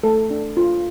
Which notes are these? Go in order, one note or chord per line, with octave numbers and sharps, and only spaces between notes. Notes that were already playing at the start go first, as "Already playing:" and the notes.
A3 A4
D4
F4